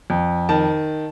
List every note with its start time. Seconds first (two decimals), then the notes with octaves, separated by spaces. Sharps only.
0.10 F2
0.49 D#3 A5